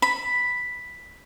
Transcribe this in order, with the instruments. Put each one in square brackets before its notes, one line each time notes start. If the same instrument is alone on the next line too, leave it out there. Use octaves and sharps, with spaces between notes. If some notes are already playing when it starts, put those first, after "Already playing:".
[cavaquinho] B5